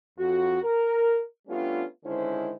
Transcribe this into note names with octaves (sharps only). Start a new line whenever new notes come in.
F2 F#4
A#4
G3 A3 B3 C#4 D4 F4
D3 D#3 G#3 C#4 E4 C5